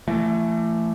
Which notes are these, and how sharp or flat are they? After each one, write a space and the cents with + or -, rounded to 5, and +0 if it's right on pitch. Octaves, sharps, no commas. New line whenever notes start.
E3 +35 A3 +15